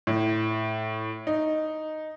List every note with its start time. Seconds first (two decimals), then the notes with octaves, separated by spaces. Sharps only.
0.07 A2
1.27 D#4